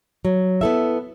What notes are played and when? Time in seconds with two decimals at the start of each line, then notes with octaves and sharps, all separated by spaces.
0.25 F#3
0.61 B3 E4 A4 E5